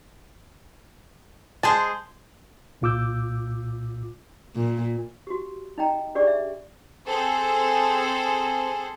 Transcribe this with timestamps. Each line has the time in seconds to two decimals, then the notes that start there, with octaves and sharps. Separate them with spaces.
1.63 G#3 G#4 C5 A5
2.81 C2 A#2 F4 D6 E6 G6
4.56 A#2
5.27 F#4 G4
5.78 D#4 D#5 G5 A#5
6.15 D4 G4 G#4 D5 C#6
6.27 E5
7.07 C4 G#4 A4 C5